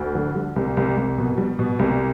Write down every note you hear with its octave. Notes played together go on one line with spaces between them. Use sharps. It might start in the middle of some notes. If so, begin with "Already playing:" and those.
Already playing: D2
D3
G3
C2
C2
C2
B2
G3
B2
C2